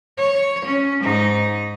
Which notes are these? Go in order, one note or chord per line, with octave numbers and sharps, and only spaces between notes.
C#5
C#4
G#2 D#4